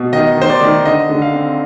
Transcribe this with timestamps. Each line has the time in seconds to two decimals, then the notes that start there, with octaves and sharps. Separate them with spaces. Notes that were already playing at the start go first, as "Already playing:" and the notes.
Already playing: B2
0.13 D#3 D#5
0.37 D#3 C5
0.49 D5
0.61 D#3
0.85 D3 D#5
1.10 D3
1.22 F5
1.34 C4